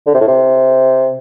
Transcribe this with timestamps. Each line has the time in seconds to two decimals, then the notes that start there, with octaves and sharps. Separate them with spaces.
0.06 D3
0.14 C3
0.20 A2
0.28 C3